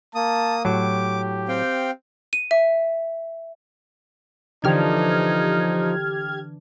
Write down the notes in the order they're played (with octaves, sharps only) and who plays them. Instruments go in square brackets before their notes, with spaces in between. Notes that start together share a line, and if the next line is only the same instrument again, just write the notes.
[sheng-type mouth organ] A#3 D#6 [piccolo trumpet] A5
[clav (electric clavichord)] A2 F#3 [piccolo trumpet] G4 [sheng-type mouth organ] D6
[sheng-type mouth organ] C4 F5 G5
[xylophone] D#7
E5
[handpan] D3 E3 D4 [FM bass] F3 [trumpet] D#4 [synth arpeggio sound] G4 F6 G#6